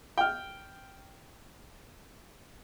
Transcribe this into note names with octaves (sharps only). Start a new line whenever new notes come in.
G5 F6